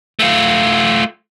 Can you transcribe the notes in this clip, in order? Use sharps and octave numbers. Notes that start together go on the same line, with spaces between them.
A3 F4